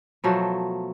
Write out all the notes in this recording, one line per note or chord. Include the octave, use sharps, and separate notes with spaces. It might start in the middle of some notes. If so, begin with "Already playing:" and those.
B2 F3 F#3 A3